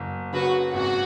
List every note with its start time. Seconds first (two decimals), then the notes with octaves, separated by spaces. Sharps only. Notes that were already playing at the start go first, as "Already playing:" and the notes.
Already playing: F#1
0.33 C#3 F#4 B4
0.73 G#1 F#4